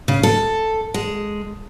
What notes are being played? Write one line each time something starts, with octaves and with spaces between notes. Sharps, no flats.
C#3
A4
G#3